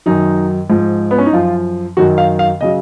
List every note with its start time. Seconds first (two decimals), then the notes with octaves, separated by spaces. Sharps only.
0.06 F#2 D#3 F#3 D#4
0.70 G#2 F3
1.11 B3
1.18 C#4
1.26 D#4
1.33 F#2 F3 F4
1.97 F#2 D#3 F#3 F#4
2.18 F5
2.39 F5
2.61 C#3 F#3 D#5